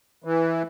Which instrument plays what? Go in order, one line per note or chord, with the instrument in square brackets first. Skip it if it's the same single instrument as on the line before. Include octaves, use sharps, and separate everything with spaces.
[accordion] E3